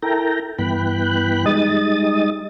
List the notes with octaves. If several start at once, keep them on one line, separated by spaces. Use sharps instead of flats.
E4 A4 A#4 G5 A#5
G2 E3 B3 G5 B5 F#6
G3 G#3 D#4 D#5 D#6 A6